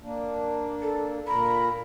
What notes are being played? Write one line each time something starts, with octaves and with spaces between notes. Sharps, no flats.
A#3 D4
A4
A#2 A#4 A#5 B5